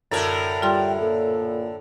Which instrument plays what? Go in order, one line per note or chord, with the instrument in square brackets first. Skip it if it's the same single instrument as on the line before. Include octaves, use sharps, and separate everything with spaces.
[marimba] F#2 A5 [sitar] A2 D3 A#4
[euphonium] G3 [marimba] F4 C6 A6 [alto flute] G5
[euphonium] A#2 [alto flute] A4